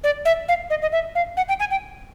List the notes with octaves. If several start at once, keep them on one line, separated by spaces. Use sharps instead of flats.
D5
E5
F5
D#5
D#5
E5
F5
F#5
G5
G#5
G5